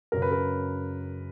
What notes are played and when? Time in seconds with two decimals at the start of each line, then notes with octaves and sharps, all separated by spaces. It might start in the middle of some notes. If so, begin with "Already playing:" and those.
0.12 F#2 C#3 A#4
0.22 B4
0.32 A#4